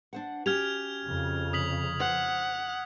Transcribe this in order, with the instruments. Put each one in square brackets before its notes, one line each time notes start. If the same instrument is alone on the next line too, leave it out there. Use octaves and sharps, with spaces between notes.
[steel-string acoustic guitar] D4 C5 F#5
[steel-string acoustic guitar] C#4 F#4 G4 [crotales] F6 G#6 F7
[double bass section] F2 C#3
[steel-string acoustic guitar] C3 [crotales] D#6 B6 F#7
[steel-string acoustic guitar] C5 [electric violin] F#5